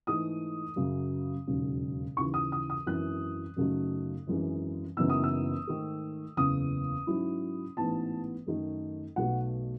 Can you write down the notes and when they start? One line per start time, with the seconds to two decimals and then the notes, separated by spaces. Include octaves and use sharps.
0.07 G#2 E3 A3 D#4 D#6
0.76 F#2 C#3 F#3
1.47 E1 D#2 C#3 F#3
2.17 D#2 C#3 E3 C#6
2.34 D#6
2.52 D#6
2.70 D#6
2.86 G#1 F#2 E3 F#6
3.57 F#2 C#3 F#3 A3 D#4
4.27 G#1 F#2 E3 G#3
4.97 F#1 F#2 E3 B3 D#4 E6
5.10 D#6
5.24 E6
5.67 G#2 D#3 A3
6.37 F#1 E2 C#3 D#6
7.07 G#2 F#3 C#4 E4
7.77 A1 G#2 E3 B3 A5
8.47 F#2 D#3 A3 D#4
9.16 B1 B2 A3 F#5